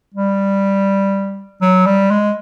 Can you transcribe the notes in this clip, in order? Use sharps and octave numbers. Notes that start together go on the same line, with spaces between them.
G3
F#3
G3
G#3